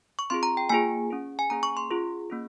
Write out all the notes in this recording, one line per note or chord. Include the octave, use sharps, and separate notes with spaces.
C#6
C4 F4 G#4 C6
A#5
G5
A#3 F4 G#4 G#5
C#4 G#4
G#5
A#3 C#4 G#4 A#5
C#6
C6
C#4 F4 G#4
A#3 C#4 G#4